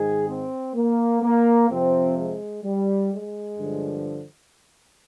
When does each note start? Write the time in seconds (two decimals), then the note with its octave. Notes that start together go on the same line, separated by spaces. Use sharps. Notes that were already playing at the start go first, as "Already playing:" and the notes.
Already playing: G#2 D#3 G#4
0.26 C4
0.74 A#3
1.21 A#3
1.69 F2 C3 F3 C4
2.16 G#3
2.63 G3
3.11 G#3
3.58 G2 D3 F3